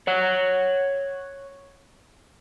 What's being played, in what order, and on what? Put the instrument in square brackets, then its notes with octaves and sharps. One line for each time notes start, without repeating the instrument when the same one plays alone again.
[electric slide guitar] C#5 F#5